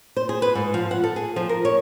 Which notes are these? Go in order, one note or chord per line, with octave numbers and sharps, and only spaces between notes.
C5
G#4
B4
G#2
F3
F#5
A4
G#4
F3
A#4
C#5